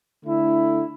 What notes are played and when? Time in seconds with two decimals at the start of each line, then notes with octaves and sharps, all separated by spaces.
0.24 D3 A3 E4